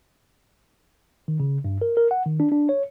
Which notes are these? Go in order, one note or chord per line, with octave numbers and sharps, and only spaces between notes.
D#3
C#3
G2
A#4
A#4
F#5
D#3
D4
D4
C#5